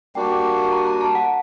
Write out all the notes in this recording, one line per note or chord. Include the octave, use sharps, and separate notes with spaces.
G3 A#3 D4 F#4 G5
A#5
A#5
A5
F#5